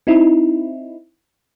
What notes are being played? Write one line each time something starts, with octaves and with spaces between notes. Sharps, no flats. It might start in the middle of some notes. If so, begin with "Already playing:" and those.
C4 D#4 E4